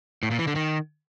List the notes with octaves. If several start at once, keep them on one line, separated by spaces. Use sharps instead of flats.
A2
A#2
E3
D3
D#3